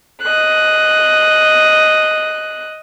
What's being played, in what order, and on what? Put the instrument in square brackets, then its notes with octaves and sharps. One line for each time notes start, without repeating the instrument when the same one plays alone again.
[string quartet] D#5 F#6